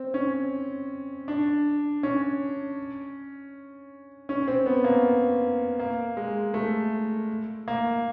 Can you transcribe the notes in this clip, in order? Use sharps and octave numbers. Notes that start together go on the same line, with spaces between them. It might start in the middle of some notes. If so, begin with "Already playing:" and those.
Already playing: C4
C#4
D4
C#4
C#4
C4
B3
A#3
A#3
G#3
A3
A#3